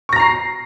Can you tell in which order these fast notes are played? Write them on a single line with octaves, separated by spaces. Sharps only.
C#6 A#6 A#5 C7